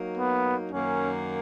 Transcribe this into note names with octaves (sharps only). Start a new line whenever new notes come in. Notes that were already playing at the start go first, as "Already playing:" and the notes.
Already playing: F#3 A#3 D#4
B3
F#2 D#3 A#3 C#4